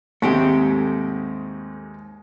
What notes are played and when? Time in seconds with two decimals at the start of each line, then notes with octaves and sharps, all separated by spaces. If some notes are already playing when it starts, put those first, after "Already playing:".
0.22 D#2 G#2 G#3 A3 C4 G4